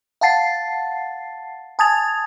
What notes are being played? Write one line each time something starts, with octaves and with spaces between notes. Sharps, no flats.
F5 F#5 A5 A6 C7
G#5 A5 D#6 G#6 A6 F7